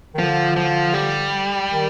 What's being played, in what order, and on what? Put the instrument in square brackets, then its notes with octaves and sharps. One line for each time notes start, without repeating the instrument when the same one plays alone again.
[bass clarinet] D#3
[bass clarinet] D3 [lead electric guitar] F3
[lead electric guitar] F3
G3
[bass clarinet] D#3